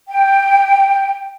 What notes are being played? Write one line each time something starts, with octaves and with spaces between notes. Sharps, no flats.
G5